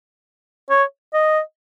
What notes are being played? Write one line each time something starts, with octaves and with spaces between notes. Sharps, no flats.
C#5
D#5